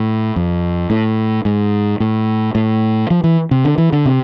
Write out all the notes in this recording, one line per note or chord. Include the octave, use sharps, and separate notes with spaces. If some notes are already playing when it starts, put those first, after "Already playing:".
Already playing: A2
F2
A2
G#2
A2
A2
F3
E3
C3
D3
E3
D3
C3